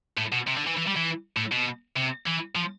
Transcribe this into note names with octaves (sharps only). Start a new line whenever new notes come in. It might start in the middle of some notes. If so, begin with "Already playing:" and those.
A2
B2
C3
D3
E3
E3
G3
E3
A2
B2
C3
E3
F3